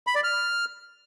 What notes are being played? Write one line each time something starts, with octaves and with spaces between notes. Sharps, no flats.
B5
D5
F6